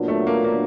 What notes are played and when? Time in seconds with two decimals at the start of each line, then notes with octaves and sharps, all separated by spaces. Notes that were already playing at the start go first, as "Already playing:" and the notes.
Already playing: A#2 F#3 B3 D4
0.08 A3
0.27 A#3
0.45 A#3